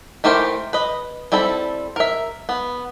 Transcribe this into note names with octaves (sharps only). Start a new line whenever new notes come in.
E3 A3 G4 A#4 C5
B4 D#5
G3 C4 E4 A4
A#4 E5
B3